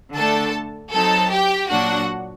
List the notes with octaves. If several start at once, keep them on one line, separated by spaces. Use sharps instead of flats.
D3 A3 D4 A4 A5
F#3 C4 D#4 A4 A5
G4 G5
A#2 F#3 A#3 D4 F#4 F#5